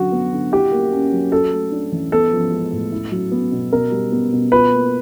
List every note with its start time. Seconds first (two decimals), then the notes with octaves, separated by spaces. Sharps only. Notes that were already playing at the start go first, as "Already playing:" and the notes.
Already playing: D3 F#3 F#4
0.12 B3
0.33 D3
0.52 E4 G4
0.72 A#3
0.93 C#4
1.12 F#3
1.32 F#4 A4
1.52 A3
1.72 D4
1.92 E3
2.12 B3 A4
2.32 F3
2.52 G#3
2.73 A2
2.92 E4
3.11 F#3
3.32 B3
3.52 B2
3.72 B2 A#4
3.91 G3
4.12 B3
4.33 B2
4.52 F4 B4
4.72 A#3